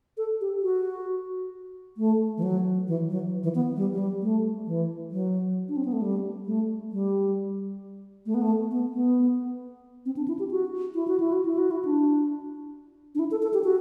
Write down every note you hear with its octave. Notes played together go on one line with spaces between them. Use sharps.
A4
G4
F#4
A3
E3
F#3
E3
F#3
E3
B3
G3
F#3
G3
A3
E3
F#3
D4
C4
B3
A3
G3
A3
G3
A3
B3
A3
B3
B3
C4
D4
E4
G4
F#4
E4
F#4
E4
F#4
E4
F#4
E4
D4
D4
E4
A4
A4
G4
F#4